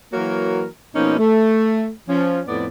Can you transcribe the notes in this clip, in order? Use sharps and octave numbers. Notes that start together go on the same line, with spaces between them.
E3 F#3 A#3 F#4 A#4 C#5
B2 F3 A#3 C#4 D#4
A3
F3 C#4
F2 A2 B3 D5